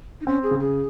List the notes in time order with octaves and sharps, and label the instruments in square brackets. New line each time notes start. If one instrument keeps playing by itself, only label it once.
[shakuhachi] D#4
[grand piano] C4 [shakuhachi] C#4
[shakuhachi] G#4
[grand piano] C#3
[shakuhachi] G#4